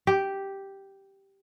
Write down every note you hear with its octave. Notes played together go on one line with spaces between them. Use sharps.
G4